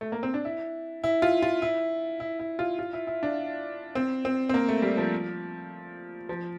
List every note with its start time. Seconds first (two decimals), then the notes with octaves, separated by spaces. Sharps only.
0.01 A3
0.12 A#3
0.23 C4
0.34 D4
0.45 E4
1.04 E4
1.22 F4
1.42 F4
1.62 E4
2.20 E4
2.39 E4
2.59 F4
2.79 F4
2.93 E4
3.07 E4
3.23 D4
3.95 C4
4.25 C4
4.49 C4
4.54 A#3
4.69 A3
4.82 G3
4.97 F3
6.29 F3